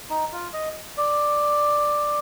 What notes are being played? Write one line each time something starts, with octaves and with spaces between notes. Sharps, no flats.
D#4
F4
D#5
D5